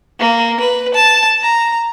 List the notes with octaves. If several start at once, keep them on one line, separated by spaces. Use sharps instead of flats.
A#3
B4
A5
A#5